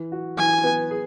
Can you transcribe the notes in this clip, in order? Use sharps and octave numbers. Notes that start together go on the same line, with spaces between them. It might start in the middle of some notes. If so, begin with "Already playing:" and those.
Already playing: E3
F#4
E3 G#5
B3
G#4